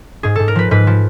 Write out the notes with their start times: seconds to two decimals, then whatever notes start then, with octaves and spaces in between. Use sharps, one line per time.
0.23 G#2 G#4
0.35 G#2 A4
0.48 A#4
0.55 F3 B4
0.71 G#2 B4
0.87 F3